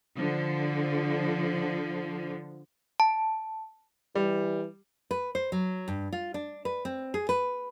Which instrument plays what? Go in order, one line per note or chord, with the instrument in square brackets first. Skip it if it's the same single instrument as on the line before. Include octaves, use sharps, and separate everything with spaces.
[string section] D3 F3
[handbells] A5
[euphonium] E3 [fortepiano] G3
[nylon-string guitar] B4
C5
F#3
G2
F4
D4
B4
C4
G#4
B4